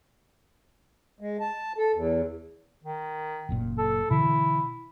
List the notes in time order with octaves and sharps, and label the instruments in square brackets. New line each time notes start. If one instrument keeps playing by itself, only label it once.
[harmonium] G#3
A5
A4
E2
[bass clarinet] D#3
[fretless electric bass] F#1 F#2 A#2
[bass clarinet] A4
[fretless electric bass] B2 D3 E3 [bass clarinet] E4